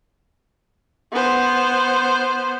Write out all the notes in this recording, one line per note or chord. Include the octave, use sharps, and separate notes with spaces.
B3 C5